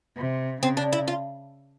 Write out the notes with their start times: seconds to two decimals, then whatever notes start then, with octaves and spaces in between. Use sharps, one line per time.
0.16 C3
0.62 C#3 C4
0.77 D4
0.93 E4
1.08 F4